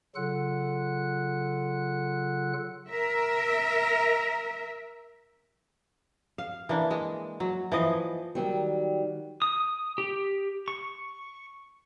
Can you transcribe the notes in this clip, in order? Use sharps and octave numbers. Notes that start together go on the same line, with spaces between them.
C#3 F#3 F4 A4 F#5 F#6
A#4 E5
F5
E3 A#3 D4
G#3
F#3
E3 F3 D#5
D#3 F#3 G3
D#6
G4
C#6